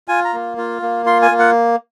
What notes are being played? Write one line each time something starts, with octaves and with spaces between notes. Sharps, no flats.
F4 G#5
A#5
A#3
F4
A#3
F4 C6
G#5
A#3
F#5